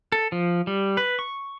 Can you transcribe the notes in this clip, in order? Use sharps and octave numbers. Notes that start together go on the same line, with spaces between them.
A4
F3
G3
B4
C#6